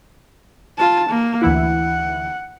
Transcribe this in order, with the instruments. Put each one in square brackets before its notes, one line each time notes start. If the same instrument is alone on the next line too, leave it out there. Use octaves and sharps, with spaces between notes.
[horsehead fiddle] F4 A5
A#3
[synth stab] D2 E3 E4 [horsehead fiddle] F#5